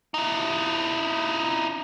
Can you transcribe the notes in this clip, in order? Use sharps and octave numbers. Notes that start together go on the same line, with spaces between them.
D#4 E4